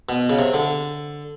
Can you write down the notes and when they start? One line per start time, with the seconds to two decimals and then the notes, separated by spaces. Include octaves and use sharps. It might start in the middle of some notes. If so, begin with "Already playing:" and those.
0.09 B2
0.30 C#3
0.39 C3
0.54 D3